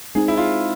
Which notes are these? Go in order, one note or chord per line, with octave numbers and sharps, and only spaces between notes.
G#3 C4 D#4 G#4
E4
F4